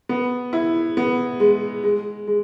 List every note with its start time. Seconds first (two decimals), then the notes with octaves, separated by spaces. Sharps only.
0.09 B3
0.53 E4
0.97 B3
1.40 G#3
1.83 G#3
2.27 G#3